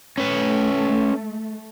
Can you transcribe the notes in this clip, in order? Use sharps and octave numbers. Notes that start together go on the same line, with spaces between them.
A3 C#4 B4